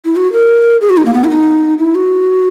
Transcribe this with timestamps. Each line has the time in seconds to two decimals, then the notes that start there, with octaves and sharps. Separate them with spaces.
0.05 E4
0.16 F#4
0.33 A#4
0.81 G#4
0.90 F#4
0.97 D#4
1.06 A#3
1.14 B3
1.24 E4
1.30 D#4
1.78 E4
1.95 F#4